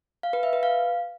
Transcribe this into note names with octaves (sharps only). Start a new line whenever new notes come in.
F5
B4
E5
B4
F5